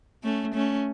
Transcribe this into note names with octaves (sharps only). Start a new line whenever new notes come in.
A3 C#4
A3 C#4